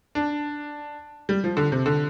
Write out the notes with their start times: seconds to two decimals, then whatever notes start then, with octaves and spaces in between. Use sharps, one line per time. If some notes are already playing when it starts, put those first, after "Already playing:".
0.15 D4
1.29 G3
1.44 F3
1.57 D3
1.72 C3
1.86 D3